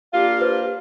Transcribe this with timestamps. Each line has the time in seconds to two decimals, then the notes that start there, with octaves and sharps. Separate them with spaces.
0.13 A#3 D4 F4 G4 F5
0.41 B4 C5